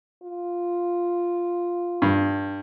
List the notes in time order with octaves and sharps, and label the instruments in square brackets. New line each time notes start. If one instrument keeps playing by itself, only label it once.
[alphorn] F4
[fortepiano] G2